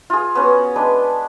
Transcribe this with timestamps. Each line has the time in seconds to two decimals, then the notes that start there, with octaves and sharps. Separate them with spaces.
0.10 F4 G#4
0.35 B3 C#4 F#4
0.76 G#3 D4 B4